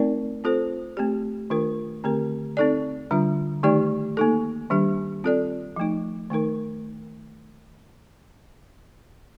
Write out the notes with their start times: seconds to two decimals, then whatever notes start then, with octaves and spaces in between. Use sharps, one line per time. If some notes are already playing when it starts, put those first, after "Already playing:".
Already playing: A3 C4 D#4 A#4 D5
0.44 C4 F4 A4 C5
0.97 A3 C4 G4
1.50 D#3 A3 D4 F4 A#4
2.04 D3 A3 C4 G4 A#4
2.57 C4 D#4 A4 D5
3.11 D3 G3 D4 F4
3.63 D#3 A3 D#4 G4 D5
4.17 A#3 D#4 A4
4.70 D#3 G3 D4 G4
5.24 C4 F4 A4 D5
5.76 F3 A3 D#4
6.30 D#3 A3 D#4 A#4